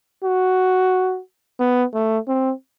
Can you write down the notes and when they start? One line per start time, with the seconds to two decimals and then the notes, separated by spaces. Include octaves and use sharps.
0.24 F#4
1.60 B3
1.94 A3
2.28 C4